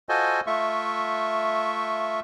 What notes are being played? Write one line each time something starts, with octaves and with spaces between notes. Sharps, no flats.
F4 F#4 A4 C5 D#5 G#5
A3 F4 E5 C#6